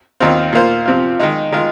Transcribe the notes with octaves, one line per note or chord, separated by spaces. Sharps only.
D#2 D#3 C4 F4
A#2 A#3 F4 C5
C3 F3 C4 F4
D#3 G#3 D#4
D#3 G#3 F4